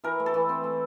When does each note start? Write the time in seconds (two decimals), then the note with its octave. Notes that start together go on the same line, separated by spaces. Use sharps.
0.04 E3 A#4
0.20 A3
0.26 A4
0.34 E3
0.49 C4
0.64 A3